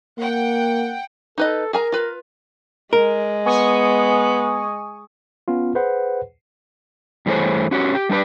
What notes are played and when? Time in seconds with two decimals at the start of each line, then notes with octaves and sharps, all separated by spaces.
0.18 A#3 F#5 G5
1.38 D#4 A4 B4 D#5
1.73 G#4 A#4 G#5 A#5
1.92 F4 B4
2.93 G#3 A#4
3.46 B3 G#5 C#6 D#6
5.48 B3 C#4 F4
5.75 G#4 B4 C5 F#5
7.26 G2 E3 A3 G#4 C5 C#5
7.71 C#4 F#4 G4 C#5
7.95 G4
8.09 G3 D4 G4 B4 D5